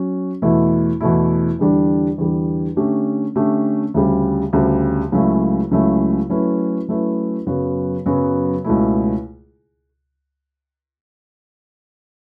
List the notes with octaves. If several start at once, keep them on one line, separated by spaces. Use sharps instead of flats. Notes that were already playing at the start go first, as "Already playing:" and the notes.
Already playing: F#3 C#4 F#4
E2 B2 A3 E4
E2 B2 A3 E4
E2 D3 G3 D4
E2 D3 G3 D4
D3 A3 C#4 G4
D3 A3 C#4 G4
D2 C#3 G3
D2 C#3 G3
C#2 C#3 F#3 A3 E4
C#2 C#3 F#3 A3 E4
F#3 A3 C#4 E4 B4
F#3 A3 C#4 E4 B4
F#2 C#3 F#3 B3 F#4
F#2 C#3 F#3 B3 F#4
C#2 B2 A3 E4